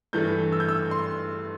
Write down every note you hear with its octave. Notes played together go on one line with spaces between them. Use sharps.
G2 E3 A3 G6
E6
G6
E6
C6